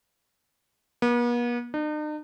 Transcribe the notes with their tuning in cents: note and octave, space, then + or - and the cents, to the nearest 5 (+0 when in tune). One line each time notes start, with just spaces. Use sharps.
B3 -45
D#4 -45